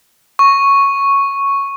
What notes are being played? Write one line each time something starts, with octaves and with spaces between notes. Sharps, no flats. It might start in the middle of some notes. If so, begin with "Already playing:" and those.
C#6